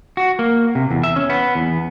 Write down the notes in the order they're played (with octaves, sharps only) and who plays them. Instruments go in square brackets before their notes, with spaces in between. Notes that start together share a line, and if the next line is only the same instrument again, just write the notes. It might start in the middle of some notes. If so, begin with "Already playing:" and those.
[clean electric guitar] F#4
A#3
C3
E2
E5
C#4
B3
E2